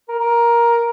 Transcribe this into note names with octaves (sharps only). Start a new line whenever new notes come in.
A#4
A#4